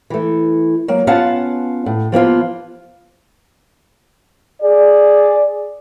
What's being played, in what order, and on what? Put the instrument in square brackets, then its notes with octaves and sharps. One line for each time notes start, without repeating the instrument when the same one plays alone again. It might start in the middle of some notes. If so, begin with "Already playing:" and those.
[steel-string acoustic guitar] E3 A3
F#3 A#3
B3 C#4 F4 F5 F#5 A5
A2
F3 A#3 B3 F4
[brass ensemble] G#4 D5